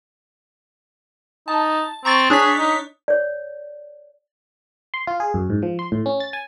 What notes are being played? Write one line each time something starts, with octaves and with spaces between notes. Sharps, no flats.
D#4 A5
C4 A#5 C#6 A6
D4 G#4 C#5 B6
D#4
C#5 D5
C6
F4
G#4
F#2
G#2
F3
C6
A2
C#4
A6
G#5